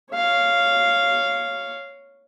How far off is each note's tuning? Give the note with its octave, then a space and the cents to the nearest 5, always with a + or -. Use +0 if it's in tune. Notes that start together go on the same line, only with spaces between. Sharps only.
C#5 +0 F5 -10